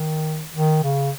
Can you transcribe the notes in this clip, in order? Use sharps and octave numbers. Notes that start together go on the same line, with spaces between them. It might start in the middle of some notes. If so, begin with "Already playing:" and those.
Already playing: D#3
D#3
C#3